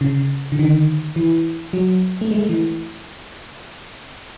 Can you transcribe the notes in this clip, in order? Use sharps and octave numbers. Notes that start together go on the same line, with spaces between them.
C#3
D3
D#3
E3
F#3
A3
G#3
A3
E3